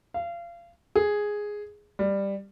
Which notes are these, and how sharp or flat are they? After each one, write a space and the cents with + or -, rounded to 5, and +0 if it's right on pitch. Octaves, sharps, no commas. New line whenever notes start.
F5 -30
G#4 +0
G3 +10